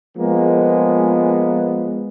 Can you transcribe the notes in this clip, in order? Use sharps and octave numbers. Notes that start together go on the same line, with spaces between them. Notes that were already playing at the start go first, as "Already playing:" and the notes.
F3 G#3 A#3 B3